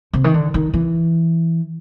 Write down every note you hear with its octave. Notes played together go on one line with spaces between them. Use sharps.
C3
D#3
D3
D#3
E3